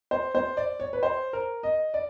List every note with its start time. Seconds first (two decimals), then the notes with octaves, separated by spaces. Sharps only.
0.11 C5
0.35 C5
0.57 D5
0.80 C#5
0.93 B4
1.03 C5
1.33 A#4
1.63 D#5
1.94 D5